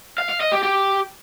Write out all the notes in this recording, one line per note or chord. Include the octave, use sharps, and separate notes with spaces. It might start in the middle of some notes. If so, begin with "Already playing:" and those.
F5
F5
D#5
G4
G4